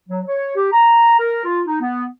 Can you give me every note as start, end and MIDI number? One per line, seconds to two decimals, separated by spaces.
0.09 0.21 54
0.26 0.54 73
0.55 0.67 67
0.72 1.18 82
1.19 1.43 70
1.45 1.61 65
1.66 1.77 63
1.81 2.05 59